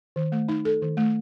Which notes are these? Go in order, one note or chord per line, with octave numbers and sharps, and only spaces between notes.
D#3
A3
D#4
A4
D#3
A3